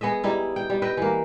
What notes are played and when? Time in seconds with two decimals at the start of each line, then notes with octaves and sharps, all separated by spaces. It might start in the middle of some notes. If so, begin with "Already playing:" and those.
0.01 B3 G#4 D#5 E5
0.24 G3 D#4 E4
0.56 G5
0.70 G3
0.82 B4 D#5 E5 G5
0.97 E3 A#3